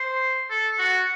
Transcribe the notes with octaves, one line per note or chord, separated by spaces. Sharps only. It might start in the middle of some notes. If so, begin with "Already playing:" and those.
Already playing: C5
A4
F#4